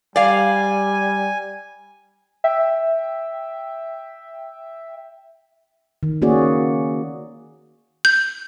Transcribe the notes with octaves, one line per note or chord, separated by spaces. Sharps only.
G3 D5 F5 G#5
E5 G5
D#3
A#3 C#4 F#4 G#4 D5
G6